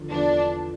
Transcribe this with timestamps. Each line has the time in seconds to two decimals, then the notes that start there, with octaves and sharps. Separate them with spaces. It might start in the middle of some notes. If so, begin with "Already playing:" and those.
Already playing: E2 D3 F3
0.10 E2 D3 F3 D4